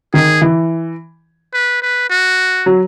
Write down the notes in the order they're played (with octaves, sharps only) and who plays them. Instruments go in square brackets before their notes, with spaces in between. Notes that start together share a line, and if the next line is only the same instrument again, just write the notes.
[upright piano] D#3 [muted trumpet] G#4
[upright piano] E3
[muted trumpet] B4
B4
F#4
[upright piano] F#3